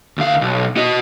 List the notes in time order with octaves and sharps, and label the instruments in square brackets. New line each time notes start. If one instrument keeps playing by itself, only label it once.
[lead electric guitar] D2 F5
B1
F#4 D#5